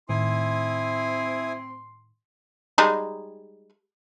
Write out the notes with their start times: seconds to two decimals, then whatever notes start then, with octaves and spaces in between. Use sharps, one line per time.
0.09 A2 D#3 C4 E4 G#5 C6 D#6
2.78 G3 G#3 D#4